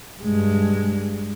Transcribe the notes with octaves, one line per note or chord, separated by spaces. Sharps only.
G2 G#3